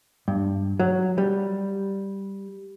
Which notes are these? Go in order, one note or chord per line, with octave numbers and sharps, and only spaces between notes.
G2
F#3
G3